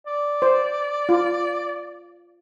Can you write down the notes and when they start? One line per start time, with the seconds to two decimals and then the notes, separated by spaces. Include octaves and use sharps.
0.07 D5
0.42 C5
1.09 F4